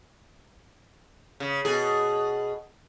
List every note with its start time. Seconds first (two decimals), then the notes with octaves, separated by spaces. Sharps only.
1.40 C#3
1.65 B2 G#4